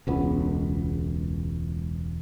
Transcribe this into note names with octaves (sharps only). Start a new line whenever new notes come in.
E1 C#2 B3